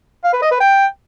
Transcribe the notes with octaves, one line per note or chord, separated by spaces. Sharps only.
F5
B4
D#5
B4
G5